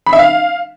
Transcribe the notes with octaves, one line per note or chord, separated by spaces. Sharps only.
B5
E5
F5